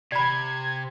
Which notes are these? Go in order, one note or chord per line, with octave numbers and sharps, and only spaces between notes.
C3 D5 B5 G#6